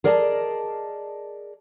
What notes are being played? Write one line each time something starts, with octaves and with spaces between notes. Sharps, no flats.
G#4 A#4 D5 D#5 F5 A5